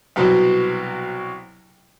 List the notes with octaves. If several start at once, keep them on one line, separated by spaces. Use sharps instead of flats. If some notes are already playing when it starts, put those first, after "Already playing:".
C2 B2 F#3 C5